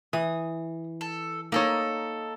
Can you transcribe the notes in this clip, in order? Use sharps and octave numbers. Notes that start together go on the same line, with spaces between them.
E3 D#6
A4
A#3 D#4 A4 C#5 D#6